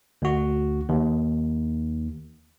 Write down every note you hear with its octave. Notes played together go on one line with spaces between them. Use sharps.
D2 F#4
D#2